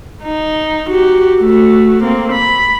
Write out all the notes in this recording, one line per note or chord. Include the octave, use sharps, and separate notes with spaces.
D#4
F#4 G4
A3 F#4
A#3 C4
B5